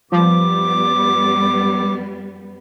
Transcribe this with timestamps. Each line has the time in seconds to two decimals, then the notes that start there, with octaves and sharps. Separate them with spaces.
0.12 F#2 F3 G3 B3 D6